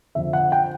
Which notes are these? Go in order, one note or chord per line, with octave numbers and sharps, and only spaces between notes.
F2 D3 F3 E5
F#5
G5